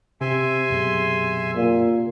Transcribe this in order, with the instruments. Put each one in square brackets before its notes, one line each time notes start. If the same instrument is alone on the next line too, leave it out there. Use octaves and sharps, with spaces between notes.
[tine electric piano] C3 [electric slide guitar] C4 [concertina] E5 G#5 C6
[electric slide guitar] F#2 B2 G#4
[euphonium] A#2